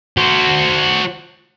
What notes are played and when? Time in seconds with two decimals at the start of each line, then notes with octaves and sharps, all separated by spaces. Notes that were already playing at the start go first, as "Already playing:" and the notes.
0.17 F#4 C5